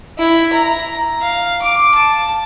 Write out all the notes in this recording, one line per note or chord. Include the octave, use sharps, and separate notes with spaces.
E4
A#5
F5
D6
A5